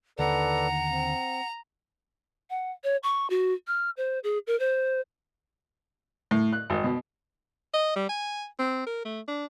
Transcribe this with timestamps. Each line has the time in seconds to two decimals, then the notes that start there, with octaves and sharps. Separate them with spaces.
0.19 D#2 D3 D#3 A4 B4 D5 F#5 A#5
0.91 C4
2.50 F#5
2.84 C#5
3.03 C#6
3.30 F#4
3.67 F6
3.97 C5
4.24 G#4
4.47 A#4
4.60 C5
6.31 A2
6.53 F#6
6.70 G#1
6.84 B2
7.74 D#5
7.96 G3
8.09 G#5
8.59 C4
8.87 A#4
9.05 A3
9.28 D4